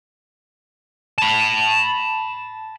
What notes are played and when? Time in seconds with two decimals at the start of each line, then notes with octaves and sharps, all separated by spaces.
1.18 A5 B5